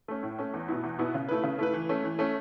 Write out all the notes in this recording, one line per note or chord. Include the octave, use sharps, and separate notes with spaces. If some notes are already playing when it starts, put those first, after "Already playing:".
A3 C#4
A2
A3 C#4
E2
B2 B3 E4
E2
B2 B3 E4
C#3
A3 E4 B4
C#3
A3 E4 B4
E3
A3 C#4
E3
A3 C#4